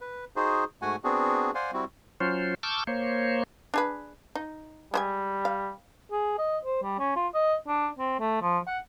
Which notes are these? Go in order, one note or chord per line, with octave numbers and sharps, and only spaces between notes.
B4
D#4 F#4 G#4 C5
G#2 A3 F#4 F#5 G#5
B3 C4 D4 F#4 G#4
C5 D5 F5 F#5 G#5 C6
G3 C4 E4 F#4
F#3 C#4 F4 C5
A5 C#6 D6 E6 F6 G6
A#3 C5 C#5
D4 G#4 B4
D#4
G3 G#3 C5 G#5
F5
G#4
D#5
C5
G3
C#4
F4
D#5
D4
C4
A3
F3
F#5